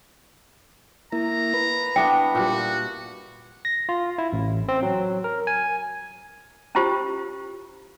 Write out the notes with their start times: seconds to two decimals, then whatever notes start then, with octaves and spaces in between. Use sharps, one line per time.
1.13 A#3 E4 A#5
1.54 B4
1.96 B3 D4 E4 G5
2.35 A#2 G3 F#4
3.65 A#6
3.89 F4
4.18 E4
4.33 A1
4.68 C4
4.82 F#3
5.24 A#4
5.47 G#5
6.75 C#4 E4 F4 G4 C5